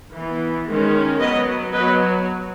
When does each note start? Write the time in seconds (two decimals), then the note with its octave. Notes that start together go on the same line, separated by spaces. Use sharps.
0.14 E3 B3
0.67 D#3 G#3 C#4
1.19 F#3 B3 B4 D#5
1.72 F#3 B3 B4 D#5